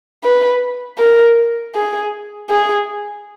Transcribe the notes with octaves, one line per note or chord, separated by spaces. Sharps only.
B4
A#4
G#4
G#4